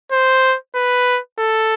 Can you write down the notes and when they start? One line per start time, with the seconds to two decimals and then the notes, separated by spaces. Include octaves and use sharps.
0.12 C5
0.76 B4
1.39 A4